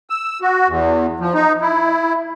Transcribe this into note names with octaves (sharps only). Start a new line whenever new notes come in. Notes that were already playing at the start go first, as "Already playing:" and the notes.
E6
F#4
E2
F3
D#4
E4